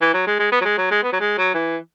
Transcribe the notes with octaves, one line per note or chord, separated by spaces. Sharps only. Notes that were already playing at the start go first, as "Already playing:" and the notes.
E3
F#3
G#3
G#3
B3
F#3
G#3
F#3
G#3
B3
F#3
G#3
F#3
E3